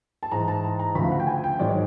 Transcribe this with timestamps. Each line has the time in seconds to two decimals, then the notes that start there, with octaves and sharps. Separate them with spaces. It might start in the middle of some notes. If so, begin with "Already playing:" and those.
0.23 A5
0.31 G#2 E3 A#5
0.48 A5
0.64 A#5
0.79 A#5
0.95 D2 C#3 F3 B5
1.04 F5
1.12 F#5
1.20 G5
1.27 G#5
1.44 G5
1.59 G#2 D#3 F#3 D5
1.69 C#5